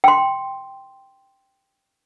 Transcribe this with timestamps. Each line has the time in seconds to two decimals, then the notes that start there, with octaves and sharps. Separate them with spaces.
0.04 G5 C6